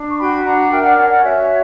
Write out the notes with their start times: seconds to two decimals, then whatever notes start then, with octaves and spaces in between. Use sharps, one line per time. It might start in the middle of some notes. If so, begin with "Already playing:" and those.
Already playing: D4
0.09 C#6
0.19 F#4 G5 B5
0.44 D4 F#5 A#5
0.71 A#4 E5 G5
0.84 D5 F#5
0.97 C#4 D5 F#5
1.10 D5 F#5
1.23 F#4 C#5 E5